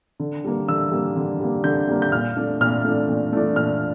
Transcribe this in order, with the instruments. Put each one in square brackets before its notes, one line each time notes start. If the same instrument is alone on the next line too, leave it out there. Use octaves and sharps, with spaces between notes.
[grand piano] D3
G3 A#3
D3 E6
G3 A#3
D3
G3 A#3
D3 G6
G3 A#3
G6
A#2 F6
A3 D4
A#2 F6
A3 D4
A#2
A3 D4
A#2 F6